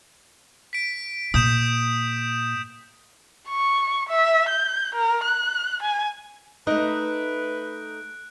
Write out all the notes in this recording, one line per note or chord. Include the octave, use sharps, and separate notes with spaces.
B6 D7
A#2 D#6 G6 E7
C#6
E5
G6
A#4
F#6
G#5
A3 D#4 B4 D#5 F#6 D7